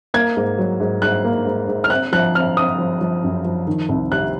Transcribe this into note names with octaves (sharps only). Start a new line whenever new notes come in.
A#3 G#6
G#2
F#3
G#2
G#2 F#6
A#3
G#2
G#2
F6
C4 F#6
F3 F#6
C4 F6
C4 D#6
F3
F3
F#2
F3
D#3
C2
C3 F#6